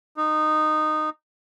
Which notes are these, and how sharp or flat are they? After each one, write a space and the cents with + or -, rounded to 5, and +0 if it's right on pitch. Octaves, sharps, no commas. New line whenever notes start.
D#4 -15